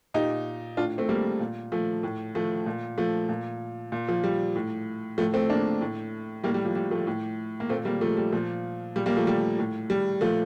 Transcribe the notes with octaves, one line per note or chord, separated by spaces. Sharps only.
A#2 D#4 G4
A2 D4 F4
A3 C4
G3 A#3
A#2
F3 A3
A2
F3 A3
A#2
F3 A3
A#2
A#2
F3
G3
A2
A2 F3 A3
A3 C4
A#3 D4
A2
A2 G3 A#3
G3
F3
G3
F3 A3
A2
A#3
A#2 A3 C4
G3 A#3
F3 A3
G3
A#2 F3
A#2 G3
G3 A#3
F3 A3
G3
A2
G3
A#2 F3 A3